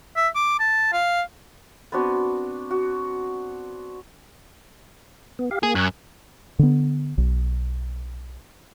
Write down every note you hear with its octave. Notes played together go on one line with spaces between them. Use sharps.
E5
D6
A5
F5
B3 C4 D4 F#4
F#4
B3
G4 F5
A#3 G#4
F#2 G#5 C#6 F#6
D3 B3
B1